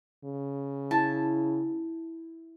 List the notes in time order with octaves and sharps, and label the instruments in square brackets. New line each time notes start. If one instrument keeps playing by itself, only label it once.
[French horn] C#3
[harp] E4 [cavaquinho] A5